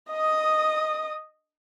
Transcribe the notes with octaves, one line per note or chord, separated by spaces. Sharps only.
D#5 D#6